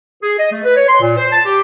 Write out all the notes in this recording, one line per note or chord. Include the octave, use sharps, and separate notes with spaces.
G#4
D#5
A3
B4
C#5
C6
A#2
C5
A5
G4